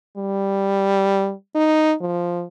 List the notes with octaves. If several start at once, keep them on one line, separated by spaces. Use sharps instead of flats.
G3
D#4
F3